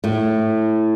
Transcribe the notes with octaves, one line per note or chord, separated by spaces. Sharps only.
A2